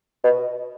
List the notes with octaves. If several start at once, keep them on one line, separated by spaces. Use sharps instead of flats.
B2